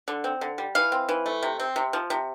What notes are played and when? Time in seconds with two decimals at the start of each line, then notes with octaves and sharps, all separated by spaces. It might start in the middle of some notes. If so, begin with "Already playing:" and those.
0.08 D3
0.24 C4
0.41 D3
0.58 G3
0.75 E3 F5
0.92 C4
1.09 E3
1.26 A3
1.43 C3
1.60 C4
1.76 C3
1.93 F3
2.10 C3